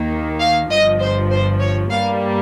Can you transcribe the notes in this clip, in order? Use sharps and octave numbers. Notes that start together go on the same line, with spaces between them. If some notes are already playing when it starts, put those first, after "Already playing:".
Already playing: D#2 D#3 A#3
F5
G1 G2 F3 D#5
C5
C5
C#5
G2 G3 A#3 F5